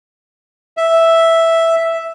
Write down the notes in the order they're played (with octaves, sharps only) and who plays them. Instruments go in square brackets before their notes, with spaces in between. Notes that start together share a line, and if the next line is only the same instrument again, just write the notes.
[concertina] E5